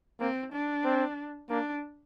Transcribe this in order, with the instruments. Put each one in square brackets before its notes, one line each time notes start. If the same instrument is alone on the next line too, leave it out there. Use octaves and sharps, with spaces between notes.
[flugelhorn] A#3 [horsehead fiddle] C4
[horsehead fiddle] D4
[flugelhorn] C4
[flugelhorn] A#3 [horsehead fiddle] D4